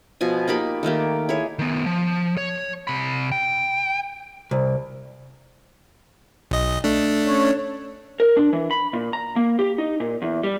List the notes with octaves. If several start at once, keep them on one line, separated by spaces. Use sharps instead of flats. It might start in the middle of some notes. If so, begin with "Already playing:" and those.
B2 F3 G#5
A#3 D#4 G4 B5
D#3 A3 A#3 G4
E4 G#4 C#5
D#3 B3
F3
C#5
C3 B5
G5
C2
B1 D#5
A3 D4
C#4 C#5
A#4
D4
E3
B5
A#2
A#5
A#3
G4
D#4
A#2
E2
G3